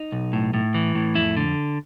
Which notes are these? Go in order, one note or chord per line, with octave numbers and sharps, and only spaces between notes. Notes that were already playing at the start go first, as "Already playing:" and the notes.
Already playing: D#4
B1
A2
A2
E3
A2
F2 E4
D3